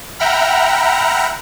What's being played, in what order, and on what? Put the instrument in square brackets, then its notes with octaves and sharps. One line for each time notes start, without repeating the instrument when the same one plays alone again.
[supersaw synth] E5 F#5 G5 A#5 B5 F6